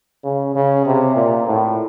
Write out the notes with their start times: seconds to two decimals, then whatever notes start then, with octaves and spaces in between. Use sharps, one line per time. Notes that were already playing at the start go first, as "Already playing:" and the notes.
0.24 C#3
0.55 C#3
0.86 C3
1.16 A#2
1.47 A2